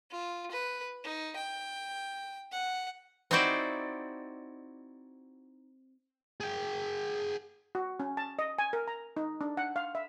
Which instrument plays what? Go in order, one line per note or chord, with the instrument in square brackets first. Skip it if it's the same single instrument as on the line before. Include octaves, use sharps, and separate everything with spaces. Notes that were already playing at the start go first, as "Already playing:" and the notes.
[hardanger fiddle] F4
B4
D#4
G5
F#5
[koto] C4 D#4 E4 F#4 C5 D5
[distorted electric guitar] G#4 G5
[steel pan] F#4
C#4
A5
D#5
G#5
A#4
A#5
D#4
D4
F#5
F5
E5